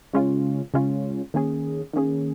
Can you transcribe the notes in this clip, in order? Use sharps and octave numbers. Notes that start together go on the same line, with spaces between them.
C#3 G#3 C#4 F4
C#3 G#3 C#4 F4
D#3 A#3 C#4 G#4
D#3 A#3 C#4 G#4